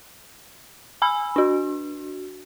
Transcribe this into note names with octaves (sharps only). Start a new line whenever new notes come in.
G#5 B5 E6
D4 F#4